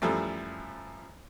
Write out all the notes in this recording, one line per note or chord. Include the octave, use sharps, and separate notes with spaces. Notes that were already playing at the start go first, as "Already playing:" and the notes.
F#2 E3 F3 G3 A3